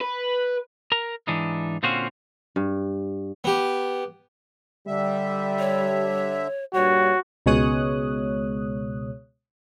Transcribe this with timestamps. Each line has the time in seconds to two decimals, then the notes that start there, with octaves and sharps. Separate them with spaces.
0.01 B4
0.92 A#4 A#5
1.28 G#2 E3 D4 D#4
1.83 A#2 D3 C4 C#4 F4 F#4
2.56 G2
3.44 B3 G4
4.87 D3 G3 E5
5.59 C#5
6.74 G2 A#2 G3 F#4 C#5
7.46 C#2 B2 G#3 C#5 D#6 F#6